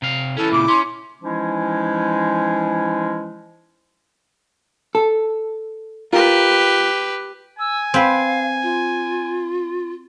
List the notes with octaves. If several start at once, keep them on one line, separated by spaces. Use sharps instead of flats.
C3 F5
E3 C#4 E4 A4
A#2 C#3 D6
C#4 C6
E3 F3 G#3 C#4 D#4 E4
A4
F4 G4 A#4 B4
G#5 E6
C4 B4 F5
F4